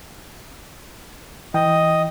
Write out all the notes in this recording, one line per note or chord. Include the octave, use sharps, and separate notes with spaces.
E3 D#5 G5